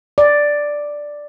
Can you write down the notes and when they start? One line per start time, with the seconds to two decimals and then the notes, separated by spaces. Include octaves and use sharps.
0.18 D5